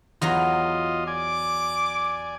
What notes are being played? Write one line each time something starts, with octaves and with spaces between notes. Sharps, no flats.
E2 F#3 F4 D#5 A#5 C6
D5 G#5 D6